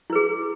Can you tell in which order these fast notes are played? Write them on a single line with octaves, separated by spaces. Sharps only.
E4 B4 G#4